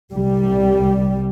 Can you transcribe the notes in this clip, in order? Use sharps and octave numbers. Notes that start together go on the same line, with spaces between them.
C2 G3